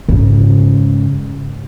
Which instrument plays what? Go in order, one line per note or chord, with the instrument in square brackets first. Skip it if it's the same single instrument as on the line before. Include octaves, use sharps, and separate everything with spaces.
[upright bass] G#2 C#3